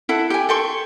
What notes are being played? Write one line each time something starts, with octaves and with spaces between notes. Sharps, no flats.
E4 A4 F#5
G4 G#5
A4 G5 C6 C#6